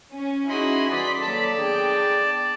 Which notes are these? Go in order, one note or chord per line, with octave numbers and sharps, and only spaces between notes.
C#4
C#4 D#4 E4 F#4 G#4 D#5 B5 C6
E3 G3 D5 C6 D#6 B6
D#3 F#3 A#3 A4 D5 A5
B3 D4 G#4 G5